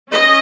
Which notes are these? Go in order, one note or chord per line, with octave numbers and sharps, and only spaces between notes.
C#4 D#5